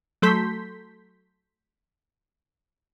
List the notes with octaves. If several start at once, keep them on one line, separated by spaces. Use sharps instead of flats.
F#3 A3 A4 C6 G6 B6